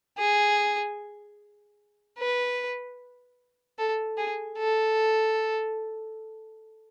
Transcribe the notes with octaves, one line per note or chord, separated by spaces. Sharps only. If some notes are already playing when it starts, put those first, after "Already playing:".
G#4
B4
A4
G#4
A4